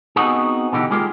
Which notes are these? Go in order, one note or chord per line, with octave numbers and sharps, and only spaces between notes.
B3 C4 D#4 F#4 G#4
B2 D3 E3 D#4 G4
G#3 A#3 F4 G4 G#4 A#4